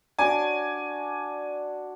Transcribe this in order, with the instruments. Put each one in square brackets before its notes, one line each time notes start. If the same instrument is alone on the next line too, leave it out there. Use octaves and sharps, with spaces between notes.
[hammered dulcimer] D4 F#4 D6 [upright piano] G#5